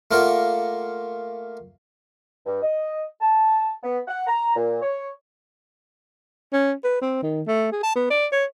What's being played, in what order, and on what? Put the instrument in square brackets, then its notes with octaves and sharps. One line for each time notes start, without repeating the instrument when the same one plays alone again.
[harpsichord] A3 A#3 F4 A#4 D5 F#5
[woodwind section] G2
D#5
A5
B3
F#5
A#5
A#2
C#5
[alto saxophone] C#4
B4
C4
D#3
A3
G#4
A5
B3
D5
C#5